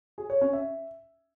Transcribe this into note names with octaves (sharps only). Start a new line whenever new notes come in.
G#4
C#5
C#4
E5